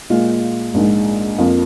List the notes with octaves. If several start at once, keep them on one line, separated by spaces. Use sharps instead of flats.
A#2 G#3 F4
A#1 G#2 G#3 D#4
F2 F3 A#3